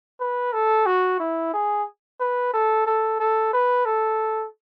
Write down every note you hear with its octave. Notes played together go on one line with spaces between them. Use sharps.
B4
A4
F#4
E4
G#4
B4
A4
A4
A4
B4
A4